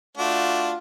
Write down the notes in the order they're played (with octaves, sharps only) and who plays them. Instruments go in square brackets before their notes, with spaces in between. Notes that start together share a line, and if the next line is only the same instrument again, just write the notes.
[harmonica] A3 D4 F#4 [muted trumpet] F4